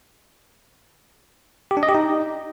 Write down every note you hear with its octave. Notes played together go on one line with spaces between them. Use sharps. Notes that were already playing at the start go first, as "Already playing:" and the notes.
G4
D4
D#5
G4
D#4